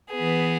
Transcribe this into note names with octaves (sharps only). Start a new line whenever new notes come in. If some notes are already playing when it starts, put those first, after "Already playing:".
E3 B3 G#4